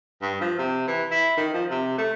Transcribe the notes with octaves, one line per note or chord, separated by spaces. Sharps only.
G2
F3
C3
E3
E4
D#3
F3
C3
A3